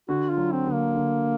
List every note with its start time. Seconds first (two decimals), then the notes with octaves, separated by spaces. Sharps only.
0.09 D3 F#4
0.30 F4
0.37 F#3
0.52 C4
0.66 D3
0.73 A#3
0.95 D3